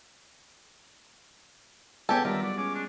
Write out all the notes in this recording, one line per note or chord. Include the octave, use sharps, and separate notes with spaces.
G#3 B3 C#4 G4 A4 G5 G#5
D#3 G3 F4 A#4 D5 E5
F#3 D5
G#3 C#4 D6
D4